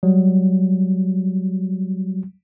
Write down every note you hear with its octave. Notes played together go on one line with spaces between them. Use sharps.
F#3 G3